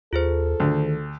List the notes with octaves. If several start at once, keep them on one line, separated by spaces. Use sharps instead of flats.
D#2 F4 G#4 A4 C5
D2 D#3